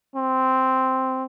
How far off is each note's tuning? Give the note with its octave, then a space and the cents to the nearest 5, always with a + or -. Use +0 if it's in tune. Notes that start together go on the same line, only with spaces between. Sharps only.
C4 -5